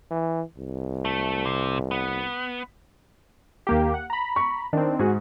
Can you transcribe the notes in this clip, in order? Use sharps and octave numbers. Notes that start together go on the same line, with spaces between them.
E3
C2
A3
C3
B3
D#2 A#3 G4
F#5
A#5 B5
C#6
D#3 C4 D4
G#2 F#4 G#4